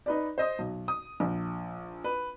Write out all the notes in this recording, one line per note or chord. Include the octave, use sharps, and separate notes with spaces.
D#4 B4 D5
C5 D#5 D#6
B1
D#6
A#1
B4